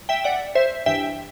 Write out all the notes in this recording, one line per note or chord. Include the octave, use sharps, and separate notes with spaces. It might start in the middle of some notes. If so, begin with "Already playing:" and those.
Already playing: C2
E5 G5
D5 F#5
C5 E5
G2 E3 E5 G5